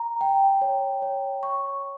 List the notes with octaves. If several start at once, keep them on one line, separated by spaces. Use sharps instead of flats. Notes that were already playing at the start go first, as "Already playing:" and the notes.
Already playing: A#5
G5
C#5
C#5
C#6